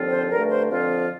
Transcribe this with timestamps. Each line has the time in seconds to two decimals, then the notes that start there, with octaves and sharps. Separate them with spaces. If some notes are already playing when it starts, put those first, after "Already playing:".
Already playing: D#2 D3 F3 C4 F4
0.11 C5
0.31 G2 D3 A3 A#4
0.50 C5
0.69 F2 D3 F3 C4 F4